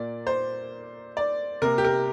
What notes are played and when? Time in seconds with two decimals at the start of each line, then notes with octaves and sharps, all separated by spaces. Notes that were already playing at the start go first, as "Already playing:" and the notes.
Already playing: A#2 A#3 D5
0.27 C5
1.17 D5
1.62 C3 A#3 A#4
1.78 G4
1.85 A#4